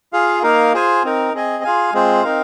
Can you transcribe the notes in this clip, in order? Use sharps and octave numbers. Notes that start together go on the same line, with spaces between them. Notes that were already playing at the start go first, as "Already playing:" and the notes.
F4 G#4 F5
A#3 D#4 A#4 F5
F4 G#4 C5 G#5
C4 D#4 A#4
C4 G#4 D#5 G#5
F4 G#4 F5 G#5
G#3 C4 F4 G#4 C5
C4 D#4 A#4 F5